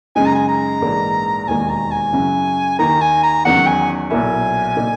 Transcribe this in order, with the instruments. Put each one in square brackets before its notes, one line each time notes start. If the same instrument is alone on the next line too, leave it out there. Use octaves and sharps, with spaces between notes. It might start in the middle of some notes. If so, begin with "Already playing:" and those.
[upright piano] F#2 C#3 G#3 D#4 [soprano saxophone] G#5
[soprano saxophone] A#5
G#5
A#5
[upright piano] A#1 G#2 E3 A#3
[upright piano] E1 D#2 D#3 A#3 [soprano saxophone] G#5
[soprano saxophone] A#5
G#5
[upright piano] F#2 C#3 F#3 C#4 E4
[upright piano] D#2 D#3 A#3 [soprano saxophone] A#5
[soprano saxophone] G#5
A#5
[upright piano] E2 D#3 F#3 C#4 [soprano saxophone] F#5
[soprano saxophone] G#5
[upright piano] B1 A#2 A#3 E4 [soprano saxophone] G#5
[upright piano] A#2 A#3 D#4